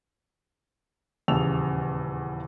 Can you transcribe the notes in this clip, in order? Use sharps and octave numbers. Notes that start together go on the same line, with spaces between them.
D#1 E2 C#3 A5 E6 F7